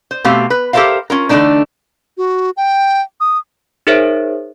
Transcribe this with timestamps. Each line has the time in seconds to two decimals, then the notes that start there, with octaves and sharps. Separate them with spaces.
0.11 C5
0.24 B2 A3 C4 G4 F5
0.50 B4
0.73 G4 A4 A#4 C5 E5 F5
1.10 C#4 F4 A#4
1.29 D3 E3 A3 A#3 D4 D#4
2.18 F#4
2.57 G5
3.20 D#6
3.87 D#4 G#4 A#4 C5 C#5 E5